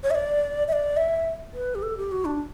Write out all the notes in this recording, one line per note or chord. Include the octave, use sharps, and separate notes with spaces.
C#5
E5
D5
E5
D5
E5
B4
G4
A4
G4
F#4
D4